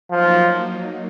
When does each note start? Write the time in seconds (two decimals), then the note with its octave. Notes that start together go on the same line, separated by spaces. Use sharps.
0.11 F3 F#3 A#3 D#4